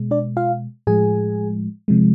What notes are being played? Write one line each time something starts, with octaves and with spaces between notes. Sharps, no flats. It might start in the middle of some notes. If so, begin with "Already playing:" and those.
Already playing: B2 G#3
D4 D5
F4 F5
A2 F3 G#3 G#4 G#5
C3 F3 G#3